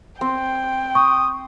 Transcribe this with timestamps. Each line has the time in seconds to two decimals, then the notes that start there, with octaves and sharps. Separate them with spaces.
0.21 C4 G5
0.95 C#6 D#6